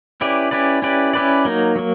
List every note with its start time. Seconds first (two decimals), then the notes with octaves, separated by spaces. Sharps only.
0.21 C#4 E4 G4 B4 D5
0.51 C#4 E4 G4 B4 D5
0.82 C#4 E4 G4 B4 D5
1.13 C#4 E4 G4 B4 D5
1.45 F#3 A#3 D#4
1.76 F#3 A#3